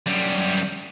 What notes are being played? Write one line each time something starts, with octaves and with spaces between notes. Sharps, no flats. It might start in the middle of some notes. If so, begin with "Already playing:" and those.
F#2 G3